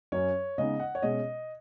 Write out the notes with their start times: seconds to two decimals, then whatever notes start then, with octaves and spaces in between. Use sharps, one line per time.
0.12 F#2 F#3 C#4 C#5
0.58 C#3 G#3 B3 D#4 D#5
0.80 F#5
0.95 C#5
1.02 B2 G#3 C#4 D#5